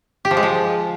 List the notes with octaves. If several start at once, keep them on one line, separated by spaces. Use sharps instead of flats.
G4
F3
G#3
F3